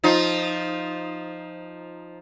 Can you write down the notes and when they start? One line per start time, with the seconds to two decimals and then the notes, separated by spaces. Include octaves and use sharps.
0.04 F3 D#4 F4